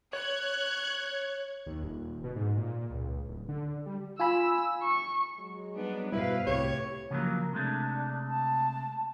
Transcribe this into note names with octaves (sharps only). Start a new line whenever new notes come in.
C#5 F#6 G#6
D#2
D#1
B2
G#2
A#2
C#2
D1
D3
G3
F4 G#5 B5 E6
C#6
F#3 G#3
G3 B3 D4
G2 B2 G3 E4 F#4 B4 C5 F5
C2 A2 G4 C#5
C#3 F3 F#3 A#3
C3 G#3 A3 D4
A5